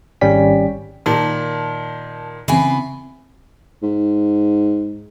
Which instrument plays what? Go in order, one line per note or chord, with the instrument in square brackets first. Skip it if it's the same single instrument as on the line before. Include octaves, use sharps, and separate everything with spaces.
[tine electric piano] G#1 G3 C#4 D5 G5 B6
[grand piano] A#2 D#3 [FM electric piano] A5
[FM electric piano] C#3 C4 [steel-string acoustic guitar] E3 B3 G#5
[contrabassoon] G#2